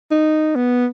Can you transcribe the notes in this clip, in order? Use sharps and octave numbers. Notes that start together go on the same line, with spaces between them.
D#4
B3